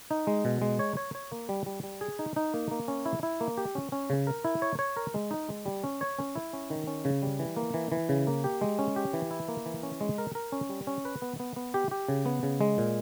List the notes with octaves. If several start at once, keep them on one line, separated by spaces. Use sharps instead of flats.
D#4
G#3
B2
G#3
C#5
C#5
C#5
A#3
G3
G3
G3
G#4
D#4
D#4
A#3
A#3
C#4
E4
E4
A#3
G4
C#4
C#4
C#3
A#4
E4
C#5
C#5
A#4
G#3
D#4
G#3
G3
C#4
C#5
C#4
E4
C#4
D#3
C#4
C#3
G3
E3
A#3
E3
E3
C#3
A#3
G4
G#3
C#4
G4
E3
E4
A#3
E3
C#4
G#3
A#4
A#4
C#4
G3
C#4
B4
B3
B3
B3
G4
G4
C#3
B3
C#3
G#3
A#2